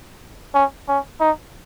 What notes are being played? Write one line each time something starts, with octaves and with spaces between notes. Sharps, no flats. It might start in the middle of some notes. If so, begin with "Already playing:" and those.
C#4
C#4
D#4